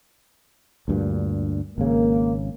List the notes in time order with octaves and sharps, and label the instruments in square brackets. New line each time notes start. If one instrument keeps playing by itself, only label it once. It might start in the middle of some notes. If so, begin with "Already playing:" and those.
[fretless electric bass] D2 G2 A#2
[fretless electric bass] G#1 C#3 [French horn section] A#3